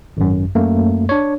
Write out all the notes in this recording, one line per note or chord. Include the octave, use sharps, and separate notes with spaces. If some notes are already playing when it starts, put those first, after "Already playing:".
G#1 F#2
F#2 A3 A#3
D4 C#5